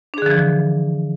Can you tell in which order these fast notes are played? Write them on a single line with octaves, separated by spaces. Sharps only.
D4 G#4 D3 F3 E3